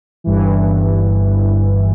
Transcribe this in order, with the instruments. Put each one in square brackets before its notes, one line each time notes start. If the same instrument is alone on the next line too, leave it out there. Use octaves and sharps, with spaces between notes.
[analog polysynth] G1 G2 E3